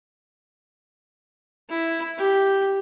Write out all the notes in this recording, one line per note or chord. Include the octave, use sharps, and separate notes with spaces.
E4
G4